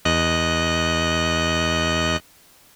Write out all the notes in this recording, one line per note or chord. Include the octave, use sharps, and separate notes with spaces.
E2 D#5 F#6